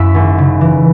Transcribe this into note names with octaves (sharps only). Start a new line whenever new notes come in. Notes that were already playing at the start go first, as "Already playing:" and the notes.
Already playing: F#2 E4 E5
G#1
C#3
E3